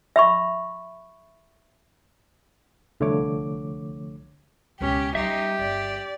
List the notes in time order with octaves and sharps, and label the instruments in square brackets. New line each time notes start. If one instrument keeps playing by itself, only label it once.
[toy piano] E5 B5 C#6
[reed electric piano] C2 D3 F3 A3 C#5 D6
[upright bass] C#2 B2 [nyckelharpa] C#4 [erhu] G4
[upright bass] G3 [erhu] D#4 [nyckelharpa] G4 [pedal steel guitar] E5 C6
[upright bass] G1 [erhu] D5